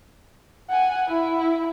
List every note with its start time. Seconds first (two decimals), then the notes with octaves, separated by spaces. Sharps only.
0.70 F#5 G#5
1.08 E4